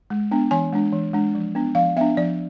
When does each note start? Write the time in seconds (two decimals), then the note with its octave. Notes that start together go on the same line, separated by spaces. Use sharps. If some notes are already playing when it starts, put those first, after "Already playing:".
0.10 G#3
0.31 B3 D4
0.51 E3 G#5
0.73 G#3 D4
0.93 E3
1.13 G#3 D4
1.35 F3
1.55 B3 D4
1.75 F3 F5
1.97 B3 D4 E5
2.17 F3 D5